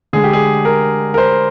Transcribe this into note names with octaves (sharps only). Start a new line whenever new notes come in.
D3 G#3 G#4
G4
G#4
A#4
A#4
C5